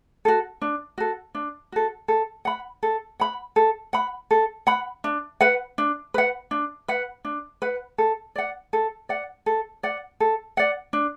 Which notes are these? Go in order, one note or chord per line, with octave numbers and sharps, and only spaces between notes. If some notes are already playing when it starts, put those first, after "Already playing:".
F#4 A4
D4
F#4 A4
D4
F#4 A4
A4
F#5 B5
A4
F#5 B5
A4
F#5 B5
A4
F#5 B5
D4
B4 F#5
D4
B4 F#5
D4
B4 F#5
D4
B4 F#5
A4
D5 F#5
A4
D5 F#5
A4
D5 F#5
A4
D5 F#5
D4